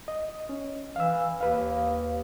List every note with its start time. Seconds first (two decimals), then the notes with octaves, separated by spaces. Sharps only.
0.08 D#5
0.49 C#4
0.96 E3 F5 E6
1.41 D#2 B4 F5